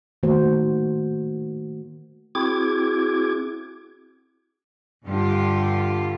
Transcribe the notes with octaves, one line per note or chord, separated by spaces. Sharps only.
D#3 A3 A#3 F#4 C5
C4 E4 F#4 G#4 D6 G#6
G2 D3 F4 G4